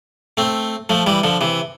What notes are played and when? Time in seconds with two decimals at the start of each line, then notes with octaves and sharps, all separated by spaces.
0.37 A3 C4
0.89 F3 A3
1.06 E3 G3
1.24 D3 F3
1.41 C3 E3